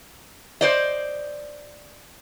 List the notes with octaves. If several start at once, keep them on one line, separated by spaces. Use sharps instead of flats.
C5 D5 D#5